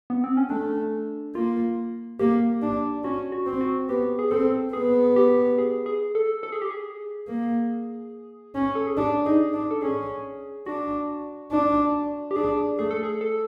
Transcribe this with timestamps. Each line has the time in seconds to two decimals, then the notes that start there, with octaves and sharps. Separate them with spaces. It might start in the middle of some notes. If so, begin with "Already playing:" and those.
0.10 B3
0.24 C4
0.37 C#4
0.50 A3 D4
1.35 A#3 F4
2.19 A#3 G4
2.62 D4
3.04 C#4 F#4
3.32 F#4
3.46 C4
3.61 F#4
3.89 B3 G4
4.19 G#4
4.31 C4 A4
4.73 B3 G#4
5.16 G4
5.58 G#4
5.86 G#4
6.15 A4
6.43 A4
6.52 G#4
6.62 G4
6.70 G#4
7.28 A#3
8.55 C#4
8.75 A4
8.87 G#4
8.97 D4 G4
9.26 D#4 G#4
9.54 D4
9.71 A4
9.82 C#4 G#4
10.66 D4 F#4
11.52 D4
12.31 G4
12.36 D4 G#4
12.78 A3 G#4
12.91 A4
13.03 G#4
13.21 A4